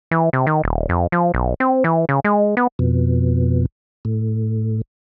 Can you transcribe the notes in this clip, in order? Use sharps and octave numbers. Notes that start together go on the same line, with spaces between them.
E3
C3
D#3
D#1
F2
F3
B1
C4
E3
C#3
G#3
B3
F2 B2
A2